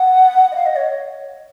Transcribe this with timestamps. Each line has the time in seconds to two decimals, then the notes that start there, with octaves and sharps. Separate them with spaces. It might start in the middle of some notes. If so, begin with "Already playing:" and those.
Already playing: F#5
0.51 D#5
0.55 F5
0.66 D#5
0.76 C#5